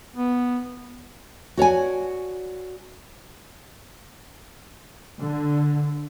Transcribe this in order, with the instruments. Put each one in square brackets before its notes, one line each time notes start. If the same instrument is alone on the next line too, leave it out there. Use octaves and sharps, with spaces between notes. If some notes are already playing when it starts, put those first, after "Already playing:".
[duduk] B3
[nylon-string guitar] F#4 C#5 D5 G#5
[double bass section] D3